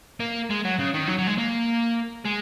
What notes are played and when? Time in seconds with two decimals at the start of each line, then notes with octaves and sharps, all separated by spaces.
0.20 A#3
0.50 G#3
0.65 F#3
0.79 C#3
0.94 D#3
1.07 F#3
1.18 F#3
1.27 G#3
1.38 A#3
2.25 G#3